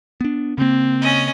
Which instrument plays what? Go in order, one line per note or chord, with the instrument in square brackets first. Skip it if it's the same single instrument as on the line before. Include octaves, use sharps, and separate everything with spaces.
[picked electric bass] B3 D4
[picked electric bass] C#3 A#3 [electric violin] C4
[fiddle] C#4 D#5